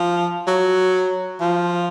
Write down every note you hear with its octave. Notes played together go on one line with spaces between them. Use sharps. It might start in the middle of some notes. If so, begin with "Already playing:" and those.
Already playing: F3
F#3
F3